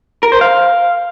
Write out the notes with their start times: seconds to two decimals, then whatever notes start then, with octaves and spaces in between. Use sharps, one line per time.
0.23 A#4
0.32 C5
0.41 F5